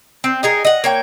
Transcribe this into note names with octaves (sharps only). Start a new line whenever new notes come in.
C4
D#4 G#4 A#4
D#5 F#5
A#3 C#5 G5